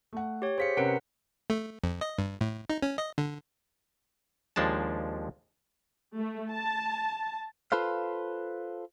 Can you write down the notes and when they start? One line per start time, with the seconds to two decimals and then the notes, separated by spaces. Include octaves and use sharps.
0.13 A3 F#5
0.42 G4 C#5
0.58 G#4 C5 F5 B6 C#7
0.77 C3 C#4 A#4 B4 F#5 D7
1.50 A3
1.83 F2
2.01 D#5
2.18 G2
2.41 A2
2.70 D#4
2.82 C#4
2.98 D#5
3.18 D3
4.56 D#2 F3 G#3 D4 A5
6.15 A3
6.51 A5
7.72 F4 A4 B4 C5 F5